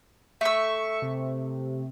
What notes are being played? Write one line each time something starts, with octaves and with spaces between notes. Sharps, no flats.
A3 E5 C#6 E6
C3